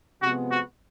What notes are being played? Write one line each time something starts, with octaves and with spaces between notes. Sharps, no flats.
C3 F3 G#3 B3 F#4
F#4